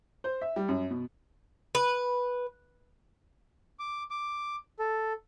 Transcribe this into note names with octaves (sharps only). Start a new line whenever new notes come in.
C5
E5
G3
F#2
B2
B4
D6
D6
A4